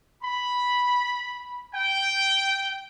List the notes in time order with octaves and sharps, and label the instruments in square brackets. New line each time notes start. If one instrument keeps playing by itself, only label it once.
[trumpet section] B5
G5